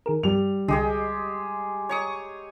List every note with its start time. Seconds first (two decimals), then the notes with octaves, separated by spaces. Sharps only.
0.06 D#3 G#4 A#4
0.23 G2 G3 F7
0.68 C2 D3 G#3 G4 G#4
1.89 C#5 C#6 D#6